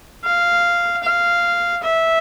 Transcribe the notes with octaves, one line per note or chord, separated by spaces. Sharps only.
F5
F5
E5